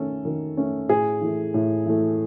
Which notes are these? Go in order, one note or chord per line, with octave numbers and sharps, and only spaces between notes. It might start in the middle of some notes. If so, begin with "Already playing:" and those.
Already playing: D#3 A3 C#4 A4
D#3
A3 C#4
A2 G#4
E3 A3
A2
E3 A3